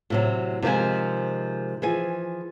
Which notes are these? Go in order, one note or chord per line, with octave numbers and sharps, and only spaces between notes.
A2 C3 F#3
C3 D#3 F3 G#3 G#5
E3 F3 G#4 G#5